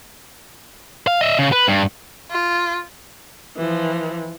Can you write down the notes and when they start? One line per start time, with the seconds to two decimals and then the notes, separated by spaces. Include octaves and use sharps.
1.07 F5
1.21 D#5 E5
1.39 C#3
1.52 B4
1.68 G2
2.31 F4
3.57 E3 F3